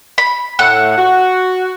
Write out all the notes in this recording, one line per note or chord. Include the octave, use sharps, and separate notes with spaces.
B5
A2 A3 F#5
F#4